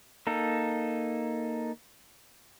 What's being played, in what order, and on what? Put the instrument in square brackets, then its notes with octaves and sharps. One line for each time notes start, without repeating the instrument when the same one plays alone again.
[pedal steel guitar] A#3 D#4 A4